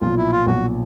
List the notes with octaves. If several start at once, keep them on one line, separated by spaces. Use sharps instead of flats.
B1 A#2 F3 F4
E4
F4
B1 A#2 F3 F#4